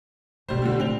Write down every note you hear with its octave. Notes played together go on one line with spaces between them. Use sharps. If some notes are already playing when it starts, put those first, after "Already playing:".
B2 G3 A3 C5
D3 F3 G3
A2 C4 F7